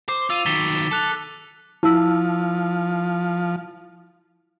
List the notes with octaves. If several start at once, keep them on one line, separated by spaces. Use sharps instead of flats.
C5 D6
F4 E6 D#7 F7
D#3 F#3 A6 B6 G7
A4 D6 F#6 F7
F3 E4 E6